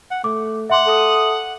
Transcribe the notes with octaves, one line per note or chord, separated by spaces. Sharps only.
F#5
A3 D6
E5 F#5 C6 D6
A4 D#6